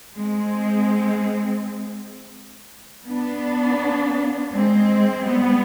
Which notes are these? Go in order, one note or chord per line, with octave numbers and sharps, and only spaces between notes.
G#3 C4
B3 D4
G#3 C4
G3 B3